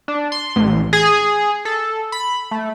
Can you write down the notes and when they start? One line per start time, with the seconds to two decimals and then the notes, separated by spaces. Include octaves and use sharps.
0.08 D4
0.32 C6
0.56 A1
0.93 G#4
1.65 A4
2.12 B5
2.51 A3